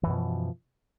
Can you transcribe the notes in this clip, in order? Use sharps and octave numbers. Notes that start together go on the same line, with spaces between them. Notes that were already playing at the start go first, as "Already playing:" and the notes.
F#2 B2 E3 F3